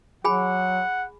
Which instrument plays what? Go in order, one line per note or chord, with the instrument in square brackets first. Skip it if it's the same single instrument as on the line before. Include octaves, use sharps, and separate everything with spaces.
[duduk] F#3 [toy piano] G#4 G#5 B5 [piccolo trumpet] F#5